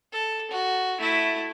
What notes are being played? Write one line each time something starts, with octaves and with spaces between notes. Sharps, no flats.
A4
F#4
A3 E4